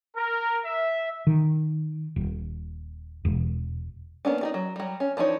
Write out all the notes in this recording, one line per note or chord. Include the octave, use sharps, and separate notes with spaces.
A#4
E5
D#3
D#1
E1
A#3 B3 C#4 D4
D#4 G#4 D5
F#3
F#3 G3
C#4
E3 F3 D4 D#4 C#5